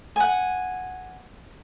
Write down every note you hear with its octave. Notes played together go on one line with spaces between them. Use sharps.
F#5 G#5